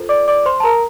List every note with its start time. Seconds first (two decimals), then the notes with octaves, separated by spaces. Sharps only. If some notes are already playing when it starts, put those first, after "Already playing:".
Already playing: F4 A4 C5
0.09 D5 D6
0.28 D5 D6
0.46 C5 C6
0.60 A5
0.63 A#4 A#5